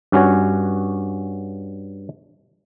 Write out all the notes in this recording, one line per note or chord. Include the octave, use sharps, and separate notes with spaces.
G2 C#4 F#4 C#5